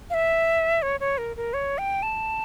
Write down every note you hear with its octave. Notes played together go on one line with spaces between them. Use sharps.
F5
E5
C#5
C#5
A#4
A#4
C#5
G5
A5